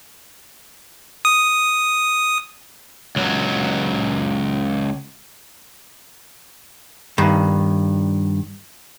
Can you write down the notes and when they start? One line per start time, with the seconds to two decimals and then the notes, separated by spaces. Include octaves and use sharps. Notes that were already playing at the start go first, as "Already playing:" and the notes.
1.25 D#6
3.16 C#2 F#3
7.18 G2 D#3